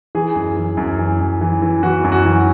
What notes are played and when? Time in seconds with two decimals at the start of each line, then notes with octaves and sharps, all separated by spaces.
0.15 E3 G#4
0.35 F#2
0.57 E3
0.77 F#2
0.99 E3
1.20 F#2
1.41 E3
1.62 E3
1.83 E3 F#4
2.04 F#2
2.12 F#4
2.25 E3